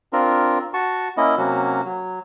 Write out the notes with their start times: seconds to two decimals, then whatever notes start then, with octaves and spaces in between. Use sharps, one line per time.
0.13 C4 D4 F4 A#4
0.74 F#4 A5 C#6
1.17 A#3 C#4 E4 D#5
1.37 C3 F#3 A#3 C#4 F#4
1.85 F#3